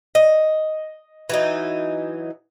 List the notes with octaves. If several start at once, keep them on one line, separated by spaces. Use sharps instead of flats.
D#5
E3 F#3 D#4